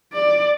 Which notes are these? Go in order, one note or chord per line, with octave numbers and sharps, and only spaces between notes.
D5